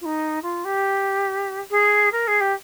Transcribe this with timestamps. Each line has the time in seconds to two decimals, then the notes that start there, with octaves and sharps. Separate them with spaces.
0.01 F4
0.05 D#4
0.43 F4
0.64 G4
1.71 G#4
2.12 A#4
2.27 G#4
2.40 G4